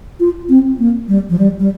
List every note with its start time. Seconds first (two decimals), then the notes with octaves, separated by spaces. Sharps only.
0.20 F4
0.49 C4
0.79 A#3
1.08 G3
1.30 F3
1.39 G3
1.60 G3